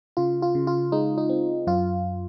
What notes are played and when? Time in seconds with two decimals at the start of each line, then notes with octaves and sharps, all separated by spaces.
0.17 C#3 F4
0.42 F4
0.55 C#3
0.67 F4
0.92 G#3 D#4
1.18 D#4
1.30 C4
1.67 F#2 F4